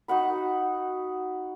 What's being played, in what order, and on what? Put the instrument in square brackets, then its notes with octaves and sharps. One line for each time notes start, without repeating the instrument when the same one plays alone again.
[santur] D#4 F#4 F#5 B5